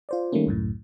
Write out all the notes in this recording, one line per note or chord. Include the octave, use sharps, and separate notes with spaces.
F4 C5 D5
D#3 G3 A3 A#3 C#4
C#2 F#2 A2